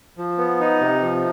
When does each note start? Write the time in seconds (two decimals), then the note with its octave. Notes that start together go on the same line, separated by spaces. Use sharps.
0.17 F3
0.38 B3
0.60 D#4
0.81 C3
1.03 F3